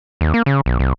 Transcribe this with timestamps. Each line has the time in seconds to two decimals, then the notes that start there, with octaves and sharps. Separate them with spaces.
0.21 D#2
0.34 A#3
0.46 C#3
0.66 B1
0.79 C2